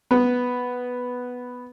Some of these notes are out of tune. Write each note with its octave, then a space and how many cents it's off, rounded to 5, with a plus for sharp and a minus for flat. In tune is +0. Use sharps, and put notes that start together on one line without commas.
B3 +0 B4 +0